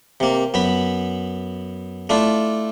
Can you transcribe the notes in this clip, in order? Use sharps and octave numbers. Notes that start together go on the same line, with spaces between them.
C3 A#3
F#2 B3 B5
A3 D4 E4 F4